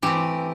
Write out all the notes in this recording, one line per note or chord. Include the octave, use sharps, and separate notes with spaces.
E3 A3 C4 G4